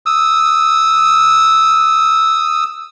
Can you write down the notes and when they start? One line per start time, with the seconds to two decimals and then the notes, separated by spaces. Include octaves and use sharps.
0.06 D#6 E6